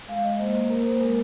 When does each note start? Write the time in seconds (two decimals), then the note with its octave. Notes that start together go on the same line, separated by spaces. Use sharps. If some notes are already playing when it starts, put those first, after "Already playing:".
0.08 G#3 F5
0.24 G#3 D#5
0.39 A#3 C5
0.54 A#3
0.70 A#3 A#4
0.85 A#3 C5
1.00 G#3 A#4